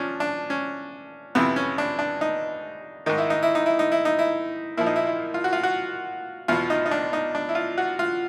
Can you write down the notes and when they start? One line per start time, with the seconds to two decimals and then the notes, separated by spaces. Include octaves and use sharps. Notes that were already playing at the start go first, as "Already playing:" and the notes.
Already playing: F3 C#4 D4
0.20 D4
0.50 C#4
1.35 F2 C3 E3 B3
1.56 C#4
1.78 D4
1.99 D4
2.21 D#4
3.06 G#2 D#3 D#4
3.18 E4
3.30 D#4
3.43 E4
3.55 D#4
3.66 E4
3.79 D#4
3.92 E4
4.05 D#4
4.19 E4
4.77 A#2 F3 E4
4.86 D#4
4.96 E4
5.07 E4
5.34 F4
5.44 F#4
5.53 F4
5.63 F#4
6.48 E2 B2 F4
6.70 D#4
6.86 D#4
6.91 D4
7.13 D#4
7.35 D4
7.49 E4
7.55 F4
7.78 F#4
7.99 F4